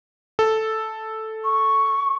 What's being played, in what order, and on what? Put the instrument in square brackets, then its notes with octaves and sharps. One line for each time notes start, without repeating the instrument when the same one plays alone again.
[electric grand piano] A4
[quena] C#6